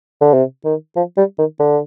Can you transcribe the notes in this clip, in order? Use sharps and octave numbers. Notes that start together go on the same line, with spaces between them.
D3
C3
D#3
F3
G3
D#3
D3